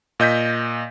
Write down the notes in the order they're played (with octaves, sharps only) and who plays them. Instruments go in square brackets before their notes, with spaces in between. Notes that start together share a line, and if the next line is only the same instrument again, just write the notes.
[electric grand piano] A#2 D#5 G6 B6